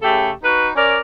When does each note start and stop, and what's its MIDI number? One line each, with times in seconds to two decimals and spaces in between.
0.02 0.30 49
0.02 0.30 57
0.02 0.30 67
0.02 0.30 69
0.43 0.68 63
0.43 0.68 66
0.43 0.68 71
0.75 0.98 61
0.75 0.98 70
0.75 0.98 74